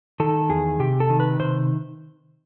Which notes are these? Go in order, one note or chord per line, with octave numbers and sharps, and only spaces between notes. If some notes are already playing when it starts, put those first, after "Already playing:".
D#3 A4
E2 G#4
C3 G4
A4
D#3
B4
C3 C5